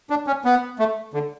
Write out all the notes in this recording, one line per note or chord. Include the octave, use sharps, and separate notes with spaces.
D4
C#4
B3
A3
D3